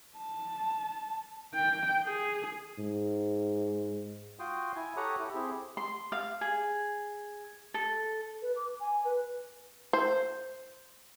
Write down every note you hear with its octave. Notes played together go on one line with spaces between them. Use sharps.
A5
G5
G#4
G#2
F4 F#4 G5 C6 D#6
E4 G#5
G4 A4 C#5 F#5 A#5 D#6
E4 G4 A4
C4 E4 G4 G#4
C6
F5
G#4
A4
B4
D6
G#5
B4
C5